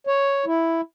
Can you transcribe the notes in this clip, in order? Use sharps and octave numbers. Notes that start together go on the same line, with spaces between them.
C#5
E4